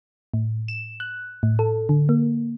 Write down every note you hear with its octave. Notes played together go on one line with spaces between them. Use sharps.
A2
E7
F#6
A2
A4
D3
A#3